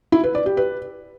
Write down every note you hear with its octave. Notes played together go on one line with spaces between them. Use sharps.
E4
B4
D5
G4
B4